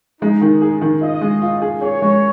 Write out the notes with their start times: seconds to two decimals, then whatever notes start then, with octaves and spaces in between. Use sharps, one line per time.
0.21 G#3 D#4
0.42 D#3
0.61 G#4
0.82 D#3
1.01 F4 D#5
1.21 G#3
1.42 F4
1.62 G#4
1.82 G#4 C#5
2.02 G#3